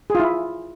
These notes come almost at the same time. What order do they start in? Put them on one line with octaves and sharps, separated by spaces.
G#4 F4 E4